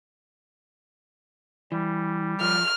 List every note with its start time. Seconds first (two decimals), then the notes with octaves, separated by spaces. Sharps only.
1.72 E3 G3
2.41 F3 F6